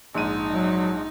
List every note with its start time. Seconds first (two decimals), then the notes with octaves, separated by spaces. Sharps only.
0.14 A#1 G#2 D#4 D#7
0.54 F#3